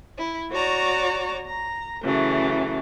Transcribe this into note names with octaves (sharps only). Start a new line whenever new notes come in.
E4
F#4 C#5 D5 A#5
A#5
C#3 E3 F#3 A3